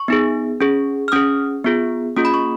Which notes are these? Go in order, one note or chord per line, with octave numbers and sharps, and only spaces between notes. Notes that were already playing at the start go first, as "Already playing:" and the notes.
Already playing: C#6
B3 D#4 G#4
C#4 G#4
F6
C#4 G#4 D#6
B3 F4 G#4
A#3 C#4 F4 G#4 D#6
B5
C#6